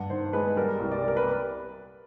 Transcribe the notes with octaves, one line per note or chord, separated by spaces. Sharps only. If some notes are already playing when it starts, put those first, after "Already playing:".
Already playing: G2 F#5
D#3 C5
G#3 B4
G3 A#4
C2
D5
G3 A#4
B4